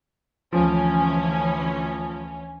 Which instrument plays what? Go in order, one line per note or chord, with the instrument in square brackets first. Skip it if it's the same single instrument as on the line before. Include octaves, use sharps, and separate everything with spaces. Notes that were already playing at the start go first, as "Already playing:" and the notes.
[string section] D2 E3 C#4 [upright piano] F3